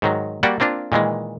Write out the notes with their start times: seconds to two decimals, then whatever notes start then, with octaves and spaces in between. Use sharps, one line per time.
0.02 G#2 D#3 F#3
0.43 G3 A#3 F#4 D5 F#5 G5
0.60 A#3 C4 D4 F4
0.92 A#2 D#3 E3 G#3